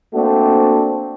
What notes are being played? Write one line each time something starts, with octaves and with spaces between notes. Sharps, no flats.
A3 A#3 C4 D4 F#4